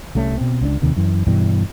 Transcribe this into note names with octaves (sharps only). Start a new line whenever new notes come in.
C2 G3 A3 C#4
B2 C4
C#2 C#4 D4
D#2 C3 D#3
F#2 E3
G2 B2 E3 G3